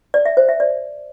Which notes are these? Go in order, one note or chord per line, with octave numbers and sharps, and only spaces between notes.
D5
E5
C5
E5
D5